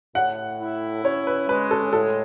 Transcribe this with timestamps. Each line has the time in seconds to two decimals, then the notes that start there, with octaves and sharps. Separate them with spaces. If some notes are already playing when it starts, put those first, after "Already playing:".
0.15 A2 F#5
0.59 E4
1.04 C#4 C#5
1.27 B4
1.48 G#3 B4
1.71 A4
1.92 A2 A4